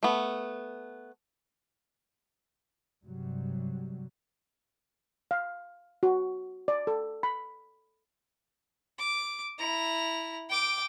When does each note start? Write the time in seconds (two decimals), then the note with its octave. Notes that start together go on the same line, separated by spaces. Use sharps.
0.03 A3 B3
3.05 G2 C3 F#3 G3
5.31 F5
6.03 F#4
6.68 D5
6.87 A4
7.23 B5
8.99 D6
9.59 E4 A#5
10.50 G5 D6